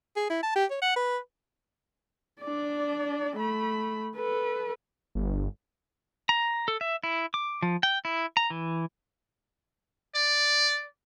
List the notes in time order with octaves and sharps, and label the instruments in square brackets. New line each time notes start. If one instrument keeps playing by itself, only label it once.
[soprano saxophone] G#4
E4
A5
G4
C#5
F#5
B4
[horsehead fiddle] D4 D5
A3 B5
A4 B4
[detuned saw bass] G1
[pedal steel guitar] A#5
A4
E5
E4
D6
F3
G5
E4
A#5
E3
[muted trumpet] D5